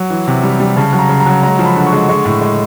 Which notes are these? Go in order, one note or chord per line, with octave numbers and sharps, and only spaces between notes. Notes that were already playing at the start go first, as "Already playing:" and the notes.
Already playing: F#3
E3
C3
G3
G3
C#3 A5
F#3
A#5
C#3
A#5
F#3
G#3 A#5
F3
B5
D3
C#6
G#3
G#3 C#6
A2
G#3